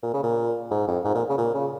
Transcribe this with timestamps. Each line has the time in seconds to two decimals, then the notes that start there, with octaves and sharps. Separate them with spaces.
0.03 A#2
0.13 C#3
0.23 A#2
0.71 G#2
0.87 F2
1.05 G#2
1.15 A#2
1.29 C#3
1.38 A#2
1.54 C#3